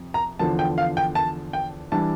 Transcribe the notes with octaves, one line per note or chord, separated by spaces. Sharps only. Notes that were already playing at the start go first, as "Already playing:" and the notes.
Already playing: F2 C3
A#5
E2 D3 F3 A5
G5
F5
G5
A5
G5
E3 G3 D4 A5